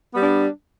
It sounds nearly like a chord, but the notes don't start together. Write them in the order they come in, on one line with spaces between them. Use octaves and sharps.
B3 G3 D4